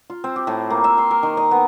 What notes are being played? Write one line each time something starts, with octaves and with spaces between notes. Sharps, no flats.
F4
C4
G4
A2
A#3
E5
C6
A#4
D#3
D#5
B3